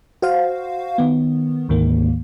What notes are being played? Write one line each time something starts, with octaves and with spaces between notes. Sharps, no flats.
F#4 C5 F5
D#3 B3
D2 G#2 D#3 A#3